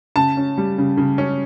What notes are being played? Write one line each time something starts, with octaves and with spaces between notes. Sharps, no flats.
C#3 A5
C#4
G3
C#3
C#3
C#4